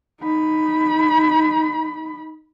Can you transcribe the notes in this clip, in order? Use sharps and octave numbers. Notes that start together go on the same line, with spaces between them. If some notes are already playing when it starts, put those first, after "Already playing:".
D#4 B5